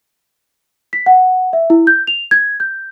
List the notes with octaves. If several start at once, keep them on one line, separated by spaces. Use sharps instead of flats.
B6
F#5
E5
E4
G6
F7
G#6
G6